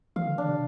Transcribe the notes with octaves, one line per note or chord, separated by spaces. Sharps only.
E3 F5
D3
E3 D4
C3